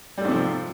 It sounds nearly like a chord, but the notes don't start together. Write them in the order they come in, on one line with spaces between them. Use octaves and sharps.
G3 A3 G#2 C3 F3